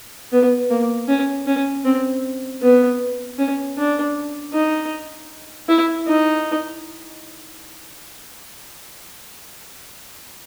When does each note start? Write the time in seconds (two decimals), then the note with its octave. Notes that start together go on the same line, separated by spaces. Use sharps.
0.32 B3
0.70 A#3
1.08 C#4
1.47 C#4
1.85 C4
2.62 B3
3.38 C#4
3.77 D4
4.53 D#4
5.69 E4
6.07 D#4